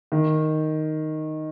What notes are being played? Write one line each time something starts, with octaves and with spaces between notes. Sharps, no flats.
D#3